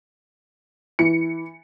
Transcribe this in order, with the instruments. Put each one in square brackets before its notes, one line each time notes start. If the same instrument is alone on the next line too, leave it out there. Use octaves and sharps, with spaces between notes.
[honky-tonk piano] E3 C#7